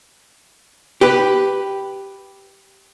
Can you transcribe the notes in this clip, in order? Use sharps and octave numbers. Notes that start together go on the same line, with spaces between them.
G4 B4